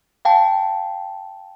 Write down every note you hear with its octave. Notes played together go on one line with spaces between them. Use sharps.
F5 G5 A5